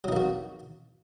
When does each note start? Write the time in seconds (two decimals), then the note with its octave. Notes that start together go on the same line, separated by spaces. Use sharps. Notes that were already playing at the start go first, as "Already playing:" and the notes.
0.04 F#3
0.08 D#4
0.12 A#3
0.16 F#4